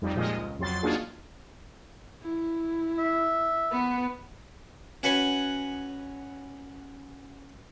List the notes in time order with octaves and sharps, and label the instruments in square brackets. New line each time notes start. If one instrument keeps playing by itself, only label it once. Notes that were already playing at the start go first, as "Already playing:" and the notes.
[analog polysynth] F2 G3 D#4
A#2 F3 G#3 F4 D#5
C#2
F2 F#3 C6 A6
A#3 D4 D#4 F4 F#4 G#4
[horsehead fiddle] E4
[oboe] E5
[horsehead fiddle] B3 B4
[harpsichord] C#4 F#4 B4 F#5 G#5